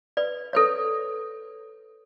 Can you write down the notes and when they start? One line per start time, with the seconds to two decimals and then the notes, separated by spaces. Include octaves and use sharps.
0.17 B4 D5
0.53 A4 B4 C#5